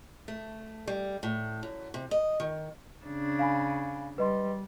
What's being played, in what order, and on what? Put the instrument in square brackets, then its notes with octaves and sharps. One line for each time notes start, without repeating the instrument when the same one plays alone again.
[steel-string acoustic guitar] A3
G3
A2
F#2
C3
D#5
D#3
[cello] C#3 D4
[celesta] F5 G#5 B5
[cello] G3 [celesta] B4 D#5 C6